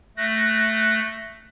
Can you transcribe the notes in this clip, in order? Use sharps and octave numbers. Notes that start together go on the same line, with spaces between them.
A3 F#6 A#6